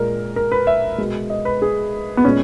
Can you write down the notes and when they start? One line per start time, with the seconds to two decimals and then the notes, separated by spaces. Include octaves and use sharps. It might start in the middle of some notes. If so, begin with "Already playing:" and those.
Already playing: A#2 G#3 A#4
0.36 A#4
0.52 B4
0.67 E5
0.98 B2 G#3
1.30 D#5
1.45 B4
1.62 G#4
2.17 B3
2.24 A#2 G#3 C#4